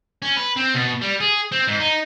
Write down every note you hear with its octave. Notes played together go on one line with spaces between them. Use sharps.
C#4
B4
C4
B2
G3
G#4
C4
G#2
D#4